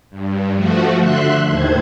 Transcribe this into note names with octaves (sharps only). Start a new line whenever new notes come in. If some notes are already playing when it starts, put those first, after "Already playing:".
G2
F3 A3 F#4
D3 E5 C6 F#6
D#2 A2 D#3 C5 G#6